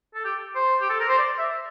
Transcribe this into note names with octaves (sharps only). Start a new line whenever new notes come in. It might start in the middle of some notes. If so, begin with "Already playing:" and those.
A4
G4
C5
G4
A4
A#4
C5
D5
E5